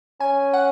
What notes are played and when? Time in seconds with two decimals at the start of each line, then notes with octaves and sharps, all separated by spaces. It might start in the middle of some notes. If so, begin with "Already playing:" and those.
0.20 C#4 G#5
0.53 F#5